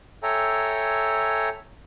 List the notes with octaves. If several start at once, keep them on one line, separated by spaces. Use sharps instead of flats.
A4 C#5 E5 G5 G#5 A#5